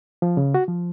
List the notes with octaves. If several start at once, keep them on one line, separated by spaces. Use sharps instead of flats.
F3
C#3
F#4
F3